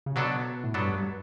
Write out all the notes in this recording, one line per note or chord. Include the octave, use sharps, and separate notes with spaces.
C#3
B2 F#3 B3 D4 A4
A2
G2 F#3 B3 D4 A4
G2